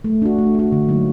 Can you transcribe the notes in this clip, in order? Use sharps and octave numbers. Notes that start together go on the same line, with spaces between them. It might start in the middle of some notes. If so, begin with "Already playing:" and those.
A3
D4 F#4
A3
D4 F#4
D3
F#3 A#3 D#4